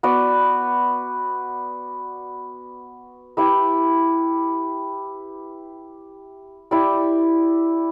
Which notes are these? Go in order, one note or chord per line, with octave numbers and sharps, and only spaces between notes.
B3 F#4 B4 D5
E4 G4 B4 E5
E4 G4 D5